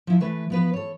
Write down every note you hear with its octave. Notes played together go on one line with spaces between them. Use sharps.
F3 E4
E3 A3 B4
F3 B3 B4
A4 C#5